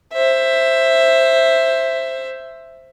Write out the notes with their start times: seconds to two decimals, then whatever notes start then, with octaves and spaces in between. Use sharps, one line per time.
0.13 C5 E5